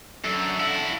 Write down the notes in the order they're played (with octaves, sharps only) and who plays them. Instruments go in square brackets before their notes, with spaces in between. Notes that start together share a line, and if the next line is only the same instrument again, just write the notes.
[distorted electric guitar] F#2 [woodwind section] D3 A4
[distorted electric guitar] E4 F#4